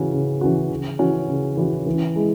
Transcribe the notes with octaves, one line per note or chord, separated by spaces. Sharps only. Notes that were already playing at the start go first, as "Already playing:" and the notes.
Already playing: C#3 E3 C#4 F#4
C#3
E3 C#4 F#4
C#3
E3 C#4 F#4
C#3
E3 C#4 F#4
E3
G#3 E4